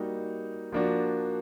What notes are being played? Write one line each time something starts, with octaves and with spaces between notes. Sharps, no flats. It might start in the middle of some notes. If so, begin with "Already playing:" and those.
Already playing: G3 A#3 D#4 F#4
F3 A#3 D4 F#4